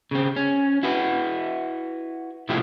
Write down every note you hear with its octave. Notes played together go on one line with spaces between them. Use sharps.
C#3 C4
C#4
E4 F#4 B4
A2 C3 F3 A3 E4 G4